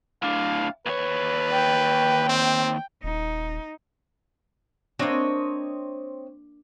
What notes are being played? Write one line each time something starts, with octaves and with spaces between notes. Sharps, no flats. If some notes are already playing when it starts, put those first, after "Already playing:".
A2 D4 F5
D#2 B4 C#5
G5
C4
D#1 D#4
A#3 C4 D4 C#5 D#5